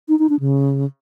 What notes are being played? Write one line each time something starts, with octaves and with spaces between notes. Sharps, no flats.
D#4
D#4
D4
C#3